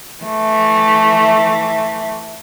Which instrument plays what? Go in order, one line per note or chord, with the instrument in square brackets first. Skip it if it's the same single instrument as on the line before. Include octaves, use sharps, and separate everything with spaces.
[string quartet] E3 A3